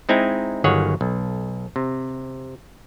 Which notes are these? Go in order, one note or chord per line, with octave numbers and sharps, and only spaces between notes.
G#3 C4 D#4 E4 G#5 A#5
G1 D#3 F#3 G#4 C#5 F#5
B1
C3